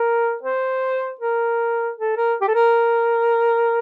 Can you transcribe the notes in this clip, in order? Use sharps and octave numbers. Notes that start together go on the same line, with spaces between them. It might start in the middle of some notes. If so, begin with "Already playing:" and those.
Already playing: A#4
C5
A#4
A4
A#4
G4
A4
A#4